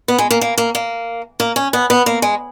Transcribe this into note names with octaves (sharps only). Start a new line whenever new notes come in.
B3
G#3
A#3
A#3
A#3
A#3
A#3
C#4
B3
B3
A#3
G#3